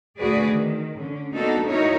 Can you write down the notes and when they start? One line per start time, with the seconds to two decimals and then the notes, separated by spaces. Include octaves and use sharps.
0.17 D2 A#2 F#4 G#4 B4 D5
0.48 D#3
0.95 D3 C#4
1.34 A#3 B3 D4 D#4 F#4 A4
1.67 D#4 E4 F#4 A#4 C#5